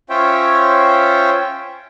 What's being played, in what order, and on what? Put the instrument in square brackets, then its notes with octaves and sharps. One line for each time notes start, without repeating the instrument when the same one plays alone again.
[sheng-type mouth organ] C#4 F4 C5 C#5 E5 G5